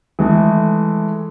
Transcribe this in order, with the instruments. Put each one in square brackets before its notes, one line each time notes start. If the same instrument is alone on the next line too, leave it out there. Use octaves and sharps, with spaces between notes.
[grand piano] E3 G#3 A3